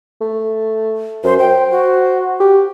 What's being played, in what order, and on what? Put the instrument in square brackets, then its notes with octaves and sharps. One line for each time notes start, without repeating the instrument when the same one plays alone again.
[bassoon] A3
[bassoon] F#2 [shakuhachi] C5
[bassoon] C5 [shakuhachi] G5
[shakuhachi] F#4
[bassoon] G4